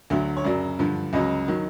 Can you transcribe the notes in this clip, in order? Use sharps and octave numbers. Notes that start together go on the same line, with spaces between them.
D2 D3 F#3
C#5
F#2 C#3 F#3 D5
G2 D3 F3
C#2 C#3 F#3 D#5
D#3 F#3